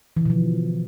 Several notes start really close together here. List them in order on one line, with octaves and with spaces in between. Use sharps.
E3 D3 B2 F3